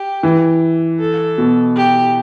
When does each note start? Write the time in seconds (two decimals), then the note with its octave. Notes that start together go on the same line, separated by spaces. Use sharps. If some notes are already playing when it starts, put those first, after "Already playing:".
Already playing: G4
0.23 E3
1.00 A4
1.38 B2
1.76 G4